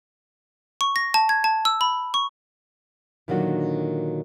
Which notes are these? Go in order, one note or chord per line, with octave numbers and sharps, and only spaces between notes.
C#6
A#6
A5
G#6
A5
E6
B5
C#6
A#2 D3 D#3 F#3 D4 F#4